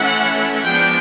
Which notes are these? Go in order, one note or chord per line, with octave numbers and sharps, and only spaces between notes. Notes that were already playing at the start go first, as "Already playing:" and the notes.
Already playing: E3 A3 C#4 E4 F#5
F3 G#3 B3 D4 G5